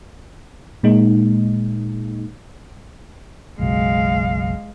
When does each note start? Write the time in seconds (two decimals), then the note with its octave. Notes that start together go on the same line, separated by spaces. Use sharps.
0.83 A#2 G#3 A#3 D#4
3.59 F#1 B1 F#3 G#3 F5